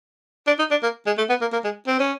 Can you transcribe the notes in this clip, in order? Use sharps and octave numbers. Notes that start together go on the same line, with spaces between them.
D4
D#4
D4
A#3
G#3
A3
B3
A#3
A#3
G#3
C4
C#4